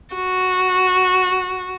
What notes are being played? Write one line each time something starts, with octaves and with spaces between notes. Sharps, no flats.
F#4